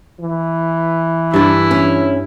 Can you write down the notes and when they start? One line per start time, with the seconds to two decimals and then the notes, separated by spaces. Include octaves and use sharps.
0.20 E3
1.34 G2 D4 E4
1.71 C#4